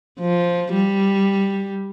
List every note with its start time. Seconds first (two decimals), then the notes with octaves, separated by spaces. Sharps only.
0.20 F3
0.73 G3